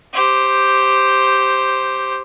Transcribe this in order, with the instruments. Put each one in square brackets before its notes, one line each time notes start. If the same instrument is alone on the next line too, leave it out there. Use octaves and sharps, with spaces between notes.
[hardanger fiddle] G4 C5